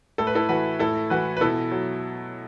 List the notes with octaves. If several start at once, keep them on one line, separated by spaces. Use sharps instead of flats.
A2 A4
B4
E4 A4
E3 F#4 B4
A2 E4 A4
E3 F#4 B4
B4
B2 E4 A4
F#3